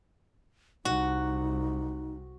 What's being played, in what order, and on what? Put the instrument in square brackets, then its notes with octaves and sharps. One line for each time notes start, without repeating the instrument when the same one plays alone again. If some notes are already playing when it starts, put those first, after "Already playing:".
[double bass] C2 [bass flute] D#4 [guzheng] F#4